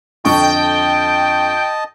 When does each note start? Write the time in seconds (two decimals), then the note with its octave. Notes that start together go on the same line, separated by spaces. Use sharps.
0.25 F2 D3 D#5 G5 A5 C#6